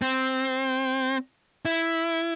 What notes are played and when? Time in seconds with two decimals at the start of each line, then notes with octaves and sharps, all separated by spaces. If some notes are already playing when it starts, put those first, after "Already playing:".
0.02 C4
1.65 E4